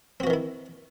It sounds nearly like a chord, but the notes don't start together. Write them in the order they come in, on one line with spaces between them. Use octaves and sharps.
C4 F#4 E3 D#3 E4